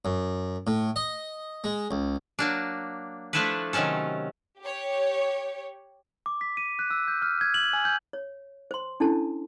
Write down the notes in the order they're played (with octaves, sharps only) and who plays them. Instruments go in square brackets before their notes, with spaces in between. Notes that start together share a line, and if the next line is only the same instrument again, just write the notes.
[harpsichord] F#2
A2
D#5
G#3
C#2
[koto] F#3 A#3 D4
F3 A3 D4 E4 A4 B4
C3 D#3 F#3 C#4 A4
[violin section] G4 C#5
[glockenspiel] D6
B6
D#7
F#6
E6
G6
F6
G#6
F#7
G#5
G6
[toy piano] C#5
C5 C6
C#4 D4 E4 A4 A5